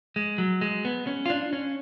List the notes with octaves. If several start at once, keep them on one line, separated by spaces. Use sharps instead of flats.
G#3
F#3
G#3
B3
C#4
F4
D4
C#4